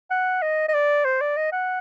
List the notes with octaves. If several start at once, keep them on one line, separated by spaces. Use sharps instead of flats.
F#5
D#5
D#5
D5
C5
D5
D#5
F#5